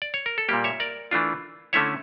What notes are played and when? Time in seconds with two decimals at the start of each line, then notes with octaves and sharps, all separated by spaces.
0.02 D5
0.14 C#5
0.26 A#4
0.38 A4
0.49 A#2 G3 A#3 G4
0.64 C#5 E5
0.80 A#4 D5
1.11 E3 A3 D4 F4
1.73 D3 A3 C#4 E4 C#5 E5